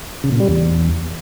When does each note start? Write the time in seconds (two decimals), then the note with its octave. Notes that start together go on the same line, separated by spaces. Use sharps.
0.24 C#3
0.32 A#2
0.40 G3
0.48 E2